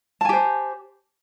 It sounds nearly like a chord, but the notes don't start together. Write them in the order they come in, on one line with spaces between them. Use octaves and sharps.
A5 G#5 G4 C5